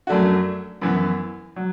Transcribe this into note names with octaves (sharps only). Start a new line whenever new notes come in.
F#2 F#3 A3 D4 F#4
F#2 E3 B3
F#3